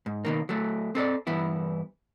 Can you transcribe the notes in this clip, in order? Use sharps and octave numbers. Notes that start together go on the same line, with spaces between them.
G#2
B2 D#3 A#3
F#3 A3
C4 A4 D5
G2 E3 B3 E4